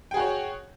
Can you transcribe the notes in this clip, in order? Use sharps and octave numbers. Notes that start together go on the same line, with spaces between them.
F#4 G#4 C#5 G5